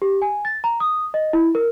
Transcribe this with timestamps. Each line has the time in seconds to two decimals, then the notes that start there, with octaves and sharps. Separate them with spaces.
0.02 G4
0.22 G#5
0.45 A6
0.64 A#5
0.80 D#6
1.14 D#5
1.33 E4
1.55 A#4